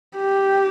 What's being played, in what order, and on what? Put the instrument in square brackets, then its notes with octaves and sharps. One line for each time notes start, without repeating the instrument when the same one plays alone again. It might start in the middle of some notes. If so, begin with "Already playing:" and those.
[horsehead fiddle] G4